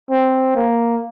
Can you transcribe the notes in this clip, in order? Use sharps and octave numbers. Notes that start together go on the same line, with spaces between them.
C4
A#3